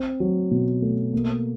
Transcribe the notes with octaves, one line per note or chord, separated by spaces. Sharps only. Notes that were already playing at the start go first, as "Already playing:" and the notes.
Already playing: C4
F#3
B2
A3
A#3